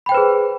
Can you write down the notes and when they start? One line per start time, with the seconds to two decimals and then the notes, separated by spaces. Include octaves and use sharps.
0.06 B5
0.09 G5
0.12 C5
0.15 B4
0.17 G#4